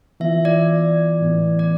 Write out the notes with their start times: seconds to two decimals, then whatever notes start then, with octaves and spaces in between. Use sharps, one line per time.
0.20 E3 B3 F4 E5
0.45 D5
1.21 A2 E3 B3
1.59 D5